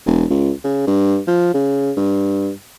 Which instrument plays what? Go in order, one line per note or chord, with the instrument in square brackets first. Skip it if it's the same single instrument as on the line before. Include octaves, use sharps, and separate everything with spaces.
[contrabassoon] E1
C#2
C#3
G2
F3
C#3
G2